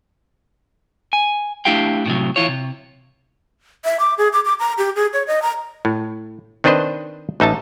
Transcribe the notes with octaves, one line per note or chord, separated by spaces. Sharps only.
G#5
A3 D4 E4 G4 F5 G5
A2 C3 F#3
E3 E4 F4 C#5
C3
E5
D6
G#4
D6
D6
A#5
G4
G#4
C#5
D#5
A#5
A2
D#3 C4 D4 B4 C5 D#5
A1 D#4 E5 A5